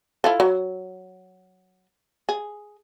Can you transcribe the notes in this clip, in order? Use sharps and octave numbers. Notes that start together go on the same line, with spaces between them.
E4 F4 A4
F#3
G#4